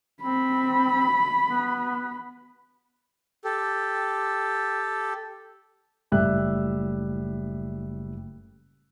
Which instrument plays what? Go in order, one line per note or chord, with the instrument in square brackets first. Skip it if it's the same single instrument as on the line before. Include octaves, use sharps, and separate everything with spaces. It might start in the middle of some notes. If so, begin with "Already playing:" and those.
[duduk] C4 [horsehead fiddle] B5
[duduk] B3
[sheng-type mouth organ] G4 A4
[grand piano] F#1 A2 G3 E5 F#6